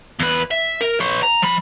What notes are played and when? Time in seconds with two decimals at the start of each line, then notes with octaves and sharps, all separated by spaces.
0.19 E2 B4
0.51 E5
0.81 A#4
1.00 B4 C#5
1.23 A#5
1.42 F3 B5